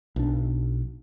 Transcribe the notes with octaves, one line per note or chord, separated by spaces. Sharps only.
B1 D4